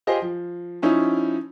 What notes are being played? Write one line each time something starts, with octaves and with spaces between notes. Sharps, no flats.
F4 G4 G#4 C5 D#5 F5
F3
F3 C#4 D#4 E4